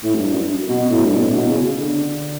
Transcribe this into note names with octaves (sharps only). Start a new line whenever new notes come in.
A2
F#2
G2
F#2
B2
A2
G2
B2
A2
B2
C#3
D3